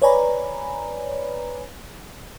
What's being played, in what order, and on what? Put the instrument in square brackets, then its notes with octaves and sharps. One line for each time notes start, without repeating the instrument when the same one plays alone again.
[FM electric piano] B4 C#5 D5 G#5 A#5 B5